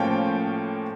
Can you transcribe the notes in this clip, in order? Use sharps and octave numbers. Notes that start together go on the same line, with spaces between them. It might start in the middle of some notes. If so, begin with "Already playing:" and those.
Already playing: A2 F3 A#3 C#4 G5